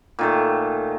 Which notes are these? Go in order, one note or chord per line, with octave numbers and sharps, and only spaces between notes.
A#2 D#3 A3